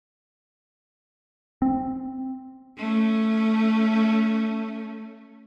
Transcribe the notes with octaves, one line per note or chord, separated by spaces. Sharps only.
C4
A3 C#4